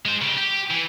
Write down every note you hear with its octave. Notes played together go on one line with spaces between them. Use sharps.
G#3 C5
C#3 G4
G4
E3